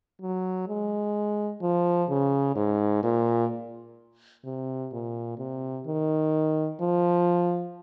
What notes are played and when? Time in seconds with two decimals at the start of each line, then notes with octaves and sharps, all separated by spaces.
0.22 F#3
0.68 G#3
1.62 F3
2.09 C#3
2.56 G#2
3.03 A#2
4.44 C3
4.92 A#2
5.38 C3
5.86 D#3
6.81 F3